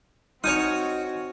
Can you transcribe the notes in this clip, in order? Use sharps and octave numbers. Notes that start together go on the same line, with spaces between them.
C4 D#4 F#4 C#5 G#5 D#6 F6